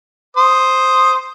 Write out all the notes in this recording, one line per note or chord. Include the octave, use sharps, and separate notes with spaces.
C5 D#6